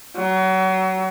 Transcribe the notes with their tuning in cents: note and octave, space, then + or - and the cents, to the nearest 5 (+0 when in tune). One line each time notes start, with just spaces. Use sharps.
F#3 +30